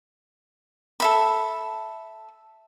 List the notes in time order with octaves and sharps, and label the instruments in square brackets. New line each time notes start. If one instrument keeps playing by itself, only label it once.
[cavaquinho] A4 E5 B5